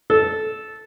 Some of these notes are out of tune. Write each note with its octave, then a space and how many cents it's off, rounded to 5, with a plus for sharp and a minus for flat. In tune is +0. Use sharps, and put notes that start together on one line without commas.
A4 -10